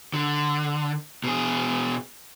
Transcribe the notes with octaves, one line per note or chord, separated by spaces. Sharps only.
D3
B2 G#4